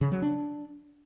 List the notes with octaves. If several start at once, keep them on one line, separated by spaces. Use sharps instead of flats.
C#3
F#3
D4